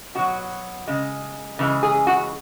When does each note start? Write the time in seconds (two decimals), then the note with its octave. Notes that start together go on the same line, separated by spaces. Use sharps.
0.15 B2 F#3 F#4
0.87 C#3 G#3
1.59 C#3 E3 G#3
1.83 G#4
2.07 F#4